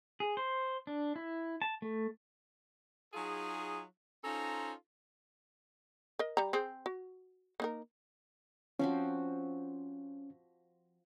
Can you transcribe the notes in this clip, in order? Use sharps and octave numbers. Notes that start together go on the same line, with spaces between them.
G#4
C5
D4
E4
A5
A3
F#3 D#4 F4 G#4
C#4 D#4 F4 A4 C5 A#5
A#4 D#5
G3 A#5
C4 G#4 C5
F#4
A#3 D#4 A#4
F3 C4 C#4 F#4